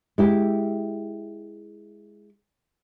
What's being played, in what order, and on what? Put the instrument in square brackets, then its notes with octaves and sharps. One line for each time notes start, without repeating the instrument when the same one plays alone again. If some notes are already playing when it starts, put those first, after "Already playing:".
[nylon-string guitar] G#3 E4 G4